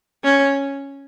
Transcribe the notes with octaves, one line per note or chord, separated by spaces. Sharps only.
C#4